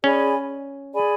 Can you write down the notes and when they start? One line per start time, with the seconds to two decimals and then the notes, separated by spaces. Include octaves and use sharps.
0.03 C#4 G#4 D5 G#5 B5
0.93 G#4 D5 G#5 B5